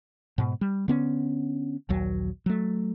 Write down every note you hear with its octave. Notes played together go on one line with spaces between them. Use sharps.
G#2 B2
G3
D3 B3 C#4
A#1 D#2 F#3
F#3 A3